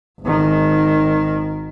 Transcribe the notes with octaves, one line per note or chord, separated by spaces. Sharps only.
G#1 D#3